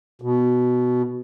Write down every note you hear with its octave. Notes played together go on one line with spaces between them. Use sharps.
B2